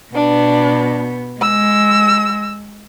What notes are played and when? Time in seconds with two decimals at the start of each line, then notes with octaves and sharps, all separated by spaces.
0.15 B2 B3 D4
1.42 G#3 E6